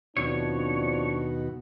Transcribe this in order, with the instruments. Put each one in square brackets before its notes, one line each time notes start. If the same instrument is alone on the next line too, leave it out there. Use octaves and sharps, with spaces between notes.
[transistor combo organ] D#2 B2 F#4 [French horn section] F3 C4 D4 [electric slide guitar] C#5